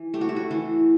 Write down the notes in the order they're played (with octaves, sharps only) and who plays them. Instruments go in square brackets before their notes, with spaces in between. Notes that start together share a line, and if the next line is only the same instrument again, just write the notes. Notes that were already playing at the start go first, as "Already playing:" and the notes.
Already playing: [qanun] E3
A3 G4
F#4
E4
F#4
E3